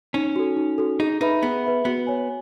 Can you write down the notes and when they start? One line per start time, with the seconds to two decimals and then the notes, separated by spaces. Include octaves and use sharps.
0.14 C#4 D#4
0.36 F#4 A4
0.57 D#4
0.78 F#4 A4
1.00 D#4 G#4
1.21 D#4 B4 E5 B5
1.42 B3 G#4
1.64 B4 E5 B5
1.85 B3 F#4
2.07 C#5 G#5